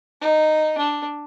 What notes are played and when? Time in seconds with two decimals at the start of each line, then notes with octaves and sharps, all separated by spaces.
0.21 D#4
0.78 D4